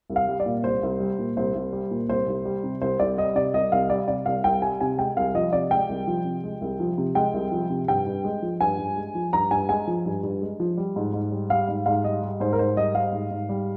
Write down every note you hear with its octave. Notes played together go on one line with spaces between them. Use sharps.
C2
F5
G3
D5
A#2
C2 C5
C2
G3
A#2
C2 C5
C2
G3
A#2
C2 C5
C2
G3
C3
C2 C5
C2 D5
G3 D#5
C3 D5
C2 D#5
C2 F5
G3 D5
C3 D5
C2 F5
C2 G5
G3 G#5
C3 G#5
G#3 G5
C2 F5
F3 D#5
C3 D5
G#3 G5
C2
F3
C3
G#3
C2
F3
C3
G#3 G5
C2
F3
C3
G2 G5
G2
G#3
F3
G2 G#5
G2
G#3
F3
G2 A#5
G2 G#5
G#3 G#5
F3
G2
G2
G#3
F3
G3
G#2
G#2
G3
G3 F5
G#2
G#2 F5
G3 D#5
G3
G#2 C5
A#4
G#2 C5
G3 D#5
G3 F5
G#2
G#2
G3